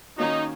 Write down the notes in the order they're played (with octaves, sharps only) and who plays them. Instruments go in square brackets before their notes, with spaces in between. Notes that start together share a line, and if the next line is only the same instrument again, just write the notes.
[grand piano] D#3 A#3 C#4 F#4 [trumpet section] D#4